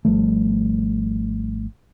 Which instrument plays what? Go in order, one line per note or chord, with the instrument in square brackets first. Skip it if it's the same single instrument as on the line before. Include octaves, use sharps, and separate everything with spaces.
[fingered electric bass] G#1 F3 G3 A3